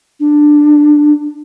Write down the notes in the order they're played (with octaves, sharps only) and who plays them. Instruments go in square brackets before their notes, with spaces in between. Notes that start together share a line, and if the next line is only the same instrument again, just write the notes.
[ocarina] D4